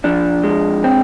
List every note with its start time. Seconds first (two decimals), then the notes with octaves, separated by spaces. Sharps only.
0.04 F3 D4
0.44 G#3
0.84 C4